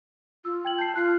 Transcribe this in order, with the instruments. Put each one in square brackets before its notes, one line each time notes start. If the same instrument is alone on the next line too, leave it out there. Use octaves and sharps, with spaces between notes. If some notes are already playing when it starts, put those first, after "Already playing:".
[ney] F4 [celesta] E6
[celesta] G5 G#6 F#7
[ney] A5 [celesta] G6 C7
[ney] F4 [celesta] F#6 C7